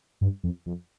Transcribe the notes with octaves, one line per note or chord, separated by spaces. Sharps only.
G2
F2
F2